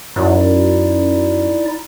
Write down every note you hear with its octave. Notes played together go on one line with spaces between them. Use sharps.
F#2 D#4 E4 D5